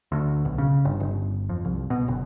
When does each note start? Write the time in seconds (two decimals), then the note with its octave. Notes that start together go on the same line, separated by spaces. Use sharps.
0.12 D2
0.45 B1
0.58 C#3
0.85 G1
1.00 G1
1.49 F2
1.65 C2
1.90 B2
2.08 F#1